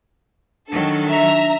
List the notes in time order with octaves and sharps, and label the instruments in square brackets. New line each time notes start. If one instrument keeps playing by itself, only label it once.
[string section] D#3 F#3 A4 [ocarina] D4
[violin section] E5 A#5